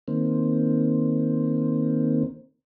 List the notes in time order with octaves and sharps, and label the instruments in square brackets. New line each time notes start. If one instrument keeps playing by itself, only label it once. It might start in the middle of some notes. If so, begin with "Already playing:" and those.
[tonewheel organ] D#3 A#3 C4